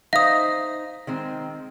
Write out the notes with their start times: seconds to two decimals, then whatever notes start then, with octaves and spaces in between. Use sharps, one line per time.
0.13 D#4 C5 E5 F5 D#6 A#6
1.07 D#3 G#3 C4